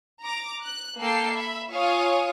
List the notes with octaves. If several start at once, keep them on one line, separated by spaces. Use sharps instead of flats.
A#5 D6
F#6
A#3 A4 G5 A5 C7
E5 B5
F4 C#5 F5 G#5 C#6 D#6